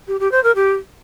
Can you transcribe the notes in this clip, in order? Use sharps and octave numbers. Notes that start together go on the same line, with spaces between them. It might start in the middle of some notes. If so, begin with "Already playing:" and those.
G4
G4
C5
A#4
G4